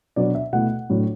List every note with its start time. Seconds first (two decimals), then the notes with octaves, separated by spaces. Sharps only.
0.16 B2 F#3 B3 D4 D5
0.35 E5
0.53 B2 A3 E4 F#5
0.90 A2 F#3 D4